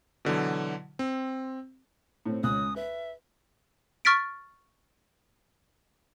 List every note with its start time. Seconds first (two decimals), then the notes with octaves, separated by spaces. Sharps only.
0.25 B2 D3 E3 F#3
0.99 C4
2.26 A2 C4
2.43 C#2 D#6 F#6
2.76 B4 E5
4.05 C#6 F6 A6 B6 D7